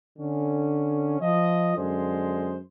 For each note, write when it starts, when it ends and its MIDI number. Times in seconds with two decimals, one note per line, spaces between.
0.19 1.19 50
0.19 1.19 61
1.21 1.76 53
1.21 1.76 75
1.76 2.58 42
1.76 2.58 50
1.76 2.58 56
1.76 2.58 72